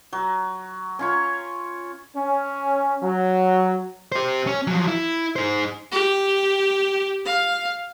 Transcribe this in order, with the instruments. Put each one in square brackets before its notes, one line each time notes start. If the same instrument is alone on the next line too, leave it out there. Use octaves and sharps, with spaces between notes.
[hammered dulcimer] F#3
C#4 F4 C#5
[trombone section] C#4
F#3
[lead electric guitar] G4 C5
C#4
F3 F#3
E4
D#4 C5
[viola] G4
F5